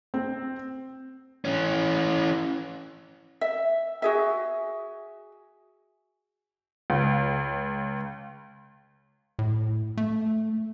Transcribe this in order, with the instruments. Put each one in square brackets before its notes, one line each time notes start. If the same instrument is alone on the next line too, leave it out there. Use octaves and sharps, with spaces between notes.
[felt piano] C4
[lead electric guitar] E3 C#4
[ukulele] E5
F#4 G#4 E5
[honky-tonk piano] C#2
[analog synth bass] A2
A3